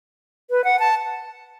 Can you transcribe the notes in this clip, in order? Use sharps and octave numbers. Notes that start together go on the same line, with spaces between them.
B4
F#5
A5